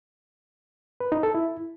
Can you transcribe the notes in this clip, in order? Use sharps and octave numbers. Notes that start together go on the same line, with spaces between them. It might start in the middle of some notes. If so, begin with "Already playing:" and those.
B4
D#4
A4
E4